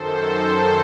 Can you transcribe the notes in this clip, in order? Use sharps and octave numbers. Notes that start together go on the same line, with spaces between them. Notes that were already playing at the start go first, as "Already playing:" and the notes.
Already playing: F#2 D#3 A4 C5
F#2 D#3 A4 C5